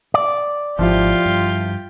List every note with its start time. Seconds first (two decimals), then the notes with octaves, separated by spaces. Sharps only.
0.14 D5
0.79 G#1 G#2 F3 E4 F4 G4
1.26 G2